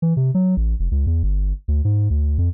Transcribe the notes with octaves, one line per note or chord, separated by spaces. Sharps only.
E3
C3
F#3
A1
F1
C#2
E2
G1
D2
G#2
D2
F2